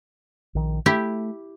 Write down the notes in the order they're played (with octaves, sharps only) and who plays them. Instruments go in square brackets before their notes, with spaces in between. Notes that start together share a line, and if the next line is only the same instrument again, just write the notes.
[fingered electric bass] A#1 D#3
[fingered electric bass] A3 [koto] E4 G4